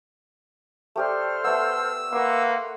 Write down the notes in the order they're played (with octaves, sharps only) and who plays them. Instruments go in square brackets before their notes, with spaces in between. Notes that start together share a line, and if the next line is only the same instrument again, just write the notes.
[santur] A3 G4 D5 [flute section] A4 C5 F6
[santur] A3 B3 [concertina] E6
[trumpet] A#3 [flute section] B4 F#5 [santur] C6 C#6